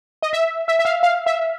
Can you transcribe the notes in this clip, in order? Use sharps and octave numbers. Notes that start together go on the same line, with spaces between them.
D#5
E5
E5
E5
F5
F5
E5